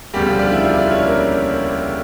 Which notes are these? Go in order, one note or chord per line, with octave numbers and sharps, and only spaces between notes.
E1 D2 C#3 G3 G4
F3 F4
D4 D5
E4 E5
F4 F5
D4 D5
C#4 C#5
A#3 A#4